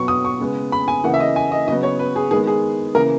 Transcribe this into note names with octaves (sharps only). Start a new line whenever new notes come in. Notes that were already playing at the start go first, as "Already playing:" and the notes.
Already playing: B2 F#3 B3 C#6
D#6
C#6
C#3 G#3 B3
B5
G#5
C#3 E3 A#3 F#5
E5
D#5
G#5
D#5
C#3 F#3 B3 D#5
C#5
B4
G#4
D#3 G#3 B3 G#4
G#4
C#3 E3 A#3 A#4